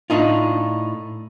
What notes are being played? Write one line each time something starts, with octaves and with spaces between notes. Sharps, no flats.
A2 D4 D#4 F4